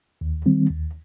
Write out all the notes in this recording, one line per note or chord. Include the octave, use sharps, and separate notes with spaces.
D#2
D#3 G3 C4
D#2